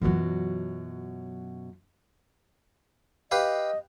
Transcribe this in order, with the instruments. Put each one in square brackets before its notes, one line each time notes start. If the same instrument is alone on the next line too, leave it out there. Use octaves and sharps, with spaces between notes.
[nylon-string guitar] F#2 B2 F#3 [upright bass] E3 F4
[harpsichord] G4 B4 F5 [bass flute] D#5